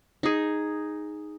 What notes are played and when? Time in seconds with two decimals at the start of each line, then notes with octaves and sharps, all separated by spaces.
0.23 D#4 G#4